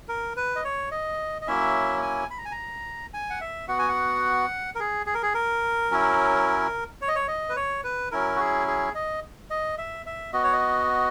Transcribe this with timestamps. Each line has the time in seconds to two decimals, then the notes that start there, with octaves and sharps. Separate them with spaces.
0.08 A#4
0.36 B4
0.56 D#5
0.64 C#5
0.91 D#5
1.42 D#5
1.47 F#3 A#3 C#4 E4 E5
2.02 G#5
2.31 B5
2.38 A#5
2.45 G#5
2.52 A#5
3.14 G#5
3.30 F#5
3.41 E5
3.68 B3 F#4 F#5
3.79 G#5
3.89 F#5
4.75 A#4
4.80 G#4
5.06 G#4
5.14 A#4
5.23 G#4
5.34 A#4
5.91 F#3 C#4 E4
7.01 C#5
7.08 D#5
7.15 C#5
7.28 D#5
7.49 B4
7.56 C#5
7.84 B4
8.11 F#3 C#4 E4 A#4
8.35 F#4
8.40 G#4
8.67 G#4
8.95 D#5
9.50 D#5
9.78 E5
10.06 E5
10.33 B3 F#4 D#5
10.44 C#5
10.53 D#5